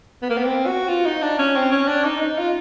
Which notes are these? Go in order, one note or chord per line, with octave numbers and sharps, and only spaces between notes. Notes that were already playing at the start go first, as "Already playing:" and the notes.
B3
A#3
B3
C4
F#4
F4
D#4
D4
C#4
C4
C#4
D4
D#4
D#4
F4